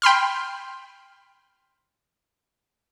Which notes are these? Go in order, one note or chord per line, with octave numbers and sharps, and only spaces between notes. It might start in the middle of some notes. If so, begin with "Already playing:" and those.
G5 B5 C6 F6